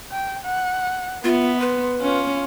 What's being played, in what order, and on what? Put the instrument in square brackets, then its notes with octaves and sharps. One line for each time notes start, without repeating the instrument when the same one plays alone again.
[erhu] G5
F#5
[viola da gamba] B3 [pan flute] F4 [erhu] E5
[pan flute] B4 [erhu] C6
[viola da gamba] C#4 [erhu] F4